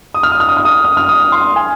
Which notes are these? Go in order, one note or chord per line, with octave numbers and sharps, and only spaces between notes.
D#6
F6
D#6
F6
D#6
F6
D#6
F6
F6
D#6
C6
G#5